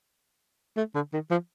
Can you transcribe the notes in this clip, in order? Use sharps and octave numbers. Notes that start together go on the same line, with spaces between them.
A3
D3
D#3
F3